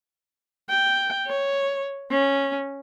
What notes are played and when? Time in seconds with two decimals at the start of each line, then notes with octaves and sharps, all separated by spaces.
0.69 G5
1.26 C#5
2.11 C#4